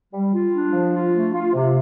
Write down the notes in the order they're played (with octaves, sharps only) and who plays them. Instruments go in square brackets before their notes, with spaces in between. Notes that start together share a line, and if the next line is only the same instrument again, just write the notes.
[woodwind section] G3
F4
D4
F3
F4
A3
F4
C3